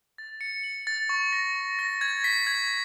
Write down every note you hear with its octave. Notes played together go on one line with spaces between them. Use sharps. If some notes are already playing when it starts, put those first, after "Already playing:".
A6
C#7
F#7
A6
C#6
A#6
C#6
A#6
G#6
B6
G#6